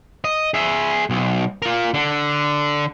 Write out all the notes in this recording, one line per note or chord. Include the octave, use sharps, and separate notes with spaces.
D#5
G#4 E5
B1
F4 A#4
D3